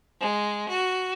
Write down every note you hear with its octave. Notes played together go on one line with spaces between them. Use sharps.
G#3
F#4